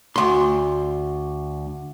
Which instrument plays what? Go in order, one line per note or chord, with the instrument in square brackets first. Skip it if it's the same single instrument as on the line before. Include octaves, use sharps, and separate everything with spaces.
[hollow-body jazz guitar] D2 C6